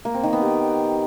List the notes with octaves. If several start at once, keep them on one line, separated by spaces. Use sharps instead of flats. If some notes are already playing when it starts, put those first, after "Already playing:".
A#3
C4
D#3
B3
G4